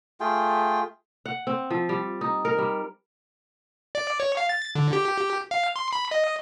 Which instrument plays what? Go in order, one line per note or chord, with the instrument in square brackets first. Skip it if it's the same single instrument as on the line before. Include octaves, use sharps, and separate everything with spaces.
[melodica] A3 F4 G#4 G5
[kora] F#5
C4
F3
G3
D#4
A#4
G3
[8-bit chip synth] D5
C#5
F5
A6
D3
G4
F5
C6
B5
D#5